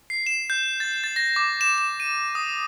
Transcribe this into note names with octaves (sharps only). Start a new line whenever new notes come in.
C7
E7
G6
A6
A6
A#6
D6
E7
E7
D#7
D#6